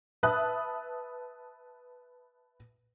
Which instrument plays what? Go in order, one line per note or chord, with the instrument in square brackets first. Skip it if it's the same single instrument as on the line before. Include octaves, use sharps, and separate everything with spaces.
[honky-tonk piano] B4 E5 A5 D#6 F#6